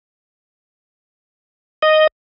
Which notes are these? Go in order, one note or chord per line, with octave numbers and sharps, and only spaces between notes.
D#5